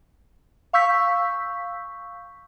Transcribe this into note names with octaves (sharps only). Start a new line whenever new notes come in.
F5 C#6 E6 G6 B6